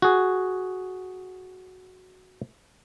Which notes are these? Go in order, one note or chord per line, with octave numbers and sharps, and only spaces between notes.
F#4 G#4